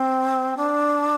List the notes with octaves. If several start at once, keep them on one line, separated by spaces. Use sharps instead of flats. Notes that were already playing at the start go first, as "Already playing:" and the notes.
Already playing: C4
D4